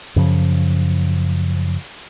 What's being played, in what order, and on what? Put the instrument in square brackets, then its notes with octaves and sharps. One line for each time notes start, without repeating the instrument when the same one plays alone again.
[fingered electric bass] F#2 C#3 F3